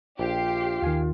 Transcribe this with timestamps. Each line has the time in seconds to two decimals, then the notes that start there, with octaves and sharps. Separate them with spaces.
0.19 A#1 F4 G4 C7
0.82 D#2 D#3 F5 G#5